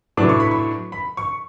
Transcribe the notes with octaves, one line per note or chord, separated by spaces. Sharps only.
A2 F#3 B3 D4 D6
C#6
B5
C#6
B5
C#6